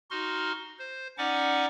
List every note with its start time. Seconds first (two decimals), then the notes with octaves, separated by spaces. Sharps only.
0.11 D#4 F#4 C6 F6
0.79 C5
1.18 C#4 D#4 D5 F#5 C#6 D6